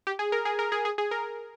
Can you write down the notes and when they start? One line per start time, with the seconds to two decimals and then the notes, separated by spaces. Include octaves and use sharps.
0.07 G4
0.19 G#4
0.32 A#4
0.45 G#4
0.59 A#4
0.72 G#4
0.85 G#4
0.98 G#4
1.11 A#4